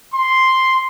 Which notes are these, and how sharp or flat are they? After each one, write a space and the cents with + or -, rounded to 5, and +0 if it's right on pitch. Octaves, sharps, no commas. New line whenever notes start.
C6 +0